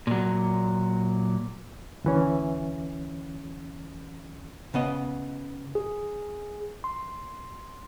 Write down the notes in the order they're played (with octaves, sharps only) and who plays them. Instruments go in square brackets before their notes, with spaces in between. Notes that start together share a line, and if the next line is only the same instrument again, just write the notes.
[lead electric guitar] A#2 F#3
[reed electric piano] D2 E3 C#4
[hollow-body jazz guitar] C#3 B3 D#5
[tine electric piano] G#4
C6